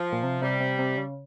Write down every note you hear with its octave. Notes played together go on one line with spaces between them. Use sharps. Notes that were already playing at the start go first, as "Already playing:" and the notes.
Already playing: F3
A#2
C3
C3 G3
C3
C3
C#3